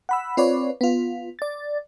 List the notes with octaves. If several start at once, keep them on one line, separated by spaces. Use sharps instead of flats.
F#5 B5 E6
C4 F4 B4 C#5 D5
B3 F4
D5 A6